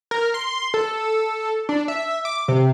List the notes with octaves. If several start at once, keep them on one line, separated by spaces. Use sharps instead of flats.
A#4
C6
A4
D4
E5
D6
C3